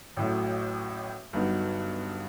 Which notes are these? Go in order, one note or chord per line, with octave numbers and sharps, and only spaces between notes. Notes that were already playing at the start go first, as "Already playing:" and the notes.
A1 A2 F#3
G1 G2 F#3 B3 D#4